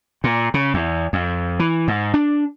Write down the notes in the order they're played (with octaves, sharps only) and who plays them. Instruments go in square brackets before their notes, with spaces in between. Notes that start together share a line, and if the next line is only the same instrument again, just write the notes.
[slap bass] A#2
C#3
E2
F2
E3
G#2
D4